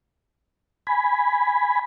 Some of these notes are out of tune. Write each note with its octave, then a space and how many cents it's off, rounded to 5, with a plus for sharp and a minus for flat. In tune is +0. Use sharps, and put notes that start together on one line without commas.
G#5 +0 B5 +0